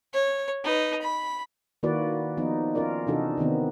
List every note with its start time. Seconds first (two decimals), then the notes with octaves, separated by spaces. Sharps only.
0.13 C#5
0.64 D#4 B4
1.01 B5
1.83 D#3 A#3 E4 F#4 B4 D5
2.37 F3 B3 D#4
2.75 C#4 F4 A#4 D5
3.07 C3 E3 D4 D#4 F#4 A4
3.37 C3 D#3 B3 C4